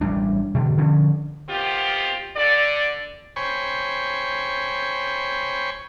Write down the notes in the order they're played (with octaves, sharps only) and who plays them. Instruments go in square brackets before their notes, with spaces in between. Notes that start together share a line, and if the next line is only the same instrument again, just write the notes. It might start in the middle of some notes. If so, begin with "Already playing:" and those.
[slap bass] A1 G3 D4
B2 D3 E3 A3
D3 F3 C#4
[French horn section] D#3 B3 C4 F4 G4
D3 D5
[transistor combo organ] C5 C#5 G5 G#5 B5 C#6